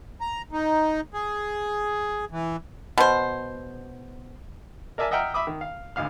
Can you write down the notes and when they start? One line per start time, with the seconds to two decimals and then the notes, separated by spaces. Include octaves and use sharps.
0.21 A#5
0.52 D#4
1.14 G#4
2.31 E3
2.98 B2 C5
4.98 A#4 D5 E5 G#5 A5
5.11 D#5 E5 F#5 G5 A#5 F6
5.34 E5 B5 D6 D#6
5.47 D#3
5.61 F5
5.96 G#1 D2 F5 F6